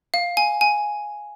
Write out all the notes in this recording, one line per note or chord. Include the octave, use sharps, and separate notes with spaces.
F5
G#5
G#5